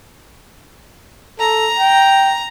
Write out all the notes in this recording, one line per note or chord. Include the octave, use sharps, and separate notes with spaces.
A4 A#5
G5